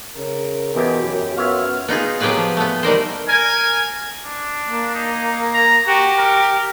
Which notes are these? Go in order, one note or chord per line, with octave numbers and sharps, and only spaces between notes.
C#3 A#4
E2 B2 E3 G4
F#2
B3 F4 C#5 E5 F6
B3 D#4 F4 G#4
F#3 B3 G4 G#4 B4 F5
F3
A3 B3
D#3 G3 A#4 C5
A#4 G#5
D4
A#3
D#4
A#5
F#4 G4
A#4